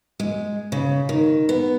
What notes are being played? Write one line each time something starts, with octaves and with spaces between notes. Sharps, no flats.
G#3
C#3
D#3
B3